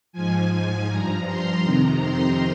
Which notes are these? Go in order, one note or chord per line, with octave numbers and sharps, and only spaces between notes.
G#2 F3 G#5
G#5
G2 F3 A#5
C6
F2 C3 D#3 A#5
C6